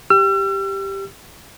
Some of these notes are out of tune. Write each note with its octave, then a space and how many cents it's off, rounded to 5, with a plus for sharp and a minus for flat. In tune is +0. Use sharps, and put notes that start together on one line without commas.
G4 +0 E6 +45